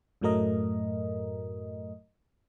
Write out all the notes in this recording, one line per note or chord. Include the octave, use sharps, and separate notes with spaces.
F#2 A2 F#3 A3 A#4 D#5